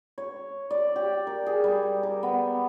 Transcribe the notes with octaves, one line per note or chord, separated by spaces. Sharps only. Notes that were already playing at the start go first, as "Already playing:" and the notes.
C#5
D5
G4
A#4
G#4
G3
A#4
B3